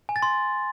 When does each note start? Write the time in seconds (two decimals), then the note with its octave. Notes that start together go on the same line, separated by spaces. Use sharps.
0.09 G#5
0.16 A6
0.22 C6